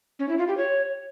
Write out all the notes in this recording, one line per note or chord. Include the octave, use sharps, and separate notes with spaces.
C#4
E4
F4
G4
C#5